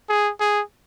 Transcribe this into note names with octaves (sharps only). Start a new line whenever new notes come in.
G#4
G#4